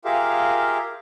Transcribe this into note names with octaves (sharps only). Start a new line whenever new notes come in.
F4 G4 G#4 A#4 E5 F5